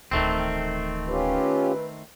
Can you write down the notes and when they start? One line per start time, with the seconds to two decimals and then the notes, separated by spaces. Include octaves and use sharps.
0.11 D1 D#3 E3 A3 C4
1.09 C#4 F4 G4 B4